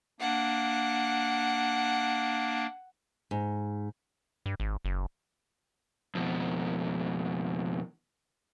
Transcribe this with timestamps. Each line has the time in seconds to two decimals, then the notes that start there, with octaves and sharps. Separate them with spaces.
0.20 A#3 D4 F#5
3.31 G#2
4.46 G2
4.60 G#1
4.85 F#1
6.15 F2 B2